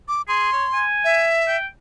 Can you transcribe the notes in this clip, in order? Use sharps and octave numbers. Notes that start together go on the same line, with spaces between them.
D6
G#4 C6
C#5
G#5
E5
G5